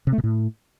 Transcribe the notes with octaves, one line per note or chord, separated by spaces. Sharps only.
C3
A3
B2
A2